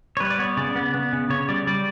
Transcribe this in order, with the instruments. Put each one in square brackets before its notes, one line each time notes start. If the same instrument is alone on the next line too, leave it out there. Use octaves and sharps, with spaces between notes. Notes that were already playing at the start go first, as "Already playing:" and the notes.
[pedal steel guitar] C#5
G3 B4
D5
B3 C#5
C#3 D5
B3
B3
C#3
C#3 C#5
G3 D5
G3 D5